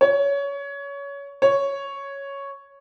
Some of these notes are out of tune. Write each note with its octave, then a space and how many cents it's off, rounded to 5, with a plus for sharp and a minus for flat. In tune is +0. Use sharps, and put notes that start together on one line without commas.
C#5 +20
C#5 +0